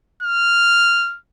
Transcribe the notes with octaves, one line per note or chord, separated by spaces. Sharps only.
F6